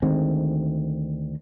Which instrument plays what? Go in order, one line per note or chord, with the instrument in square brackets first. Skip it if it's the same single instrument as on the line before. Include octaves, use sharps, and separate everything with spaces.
[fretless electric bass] D2 D#3 G#3 C4